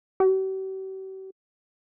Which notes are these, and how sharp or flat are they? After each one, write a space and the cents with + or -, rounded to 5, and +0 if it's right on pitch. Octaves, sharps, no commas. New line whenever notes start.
G4 -45